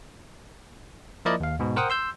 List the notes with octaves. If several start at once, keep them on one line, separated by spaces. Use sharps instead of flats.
F3 A#3 E4 A#4 D5 D#5
D#2 F5
G#2 B2
A#4 C5 F#5 G5 D#6
C6 E6 G6